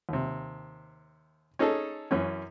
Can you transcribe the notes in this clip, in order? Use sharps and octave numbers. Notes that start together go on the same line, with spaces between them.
D#2 C3
C#4 D#4 G#4 A4
F#2 E3 C#4